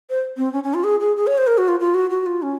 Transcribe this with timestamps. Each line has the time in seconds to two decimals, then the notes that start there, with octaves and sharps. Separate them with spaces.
0.10 C5
0.37 C4
0.53 C#4
0.64 C#4
0.74 F4
0.84 G#4
1.00 G#4
1.17 G#4
1.27 C#5
1.38 C5
1.47 A#4
1.58 F#4
1.68 F4
1.80 F4
1.94 F#4
2.10 F#4
2.26 F4
2.42 C#4